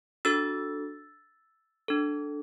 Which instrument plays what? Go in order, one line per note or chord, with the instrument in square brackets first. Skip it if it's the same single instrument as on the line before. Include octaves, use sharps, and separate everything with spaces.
[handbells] D4 F#4 A4 E6 A6
D4 A4